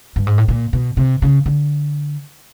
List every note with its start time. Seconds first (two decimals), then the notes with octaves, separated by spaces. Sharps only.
0.16 G2
0.27 G#2
0.38 A2
0.48 A#2
0.73 B2
0.97 C3
1.22 C#3
1.46 D3